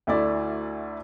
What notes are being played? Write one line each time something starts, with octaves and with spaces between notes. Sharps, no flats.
D2 A3 E4 D5